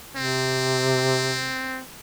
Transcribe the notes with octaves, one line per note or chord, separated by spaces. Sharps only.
C3 C4